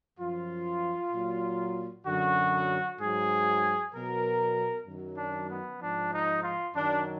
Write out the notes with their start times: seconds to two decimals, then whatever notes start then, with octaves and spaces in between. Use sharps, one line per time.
0.19 F#2 F3 F4
1.12 A#2 F#3
2.06 F#2 D3 F#3 F#4
2.99 G#2 F#3 G#4
3.93 B2 F#3 A#4
4.87 F#2 D#3 F#3
5.18 D4
5.49 B3
5.80 G#2 F3 D4
6.12 D#4
6.43 F4
6.74 F#2 D#3 F#3 D4